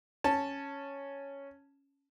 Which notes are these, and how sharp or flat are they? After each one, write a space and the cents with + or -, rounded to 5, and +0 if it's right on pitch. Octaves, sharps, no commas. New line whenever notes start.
C#4 +0 A5 +0